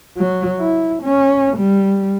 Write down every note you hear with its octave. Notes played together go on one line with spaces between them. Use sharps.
F#3
E4
C#4
G3